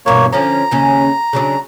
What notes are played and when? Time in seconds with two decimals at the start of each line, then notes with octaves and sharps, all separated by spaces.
0.06 E2 G2 B2 A#3 C#5
0.32 D3 F3 C#4 A#5
0.71 D#2 C#3 C#4
1.33 C#3 F#3 D4